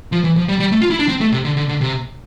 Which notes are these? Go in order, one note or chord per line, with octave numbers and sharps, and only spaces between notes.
F3
E3
F3
G3
G3
A3
F4
E4
D4
C4
A3
C3
D3
D3
D3
C3